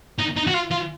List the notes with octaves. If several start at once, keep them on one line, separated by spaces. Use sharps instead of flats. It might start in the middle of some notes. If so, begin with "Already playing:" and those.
D#4
D#4
F#4
F4
F4